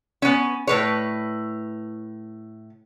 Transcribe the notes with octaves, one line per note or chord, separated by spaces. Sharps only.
B3 C#4
A2 B4 C#5